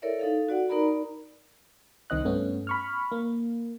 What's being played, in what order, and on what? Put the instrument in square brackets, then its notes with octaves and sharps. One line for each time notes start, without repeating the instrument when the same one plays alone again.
[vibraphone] E4 A4 A#4 C#5 D5 E5
D#4 A4 F5
F#4 D5 F#5
D#4 A#4 D5 A#5 B5
[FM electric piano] C2 D#3 C4 D#5 F#6
G2 A3 B3 C#4
B5 C#6 F6
A#3